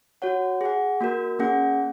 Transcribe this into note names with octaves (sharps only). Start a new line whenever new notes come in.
F#4 C#5 F#5
G#4 F#5
A#3 F#4 A#4
A#3 C#4 G#4 F#5